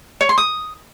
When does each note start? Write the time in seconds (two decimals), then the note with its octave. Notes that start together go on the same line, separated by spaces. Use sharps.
0.21 C#5
0.29 C6
0.38 D#6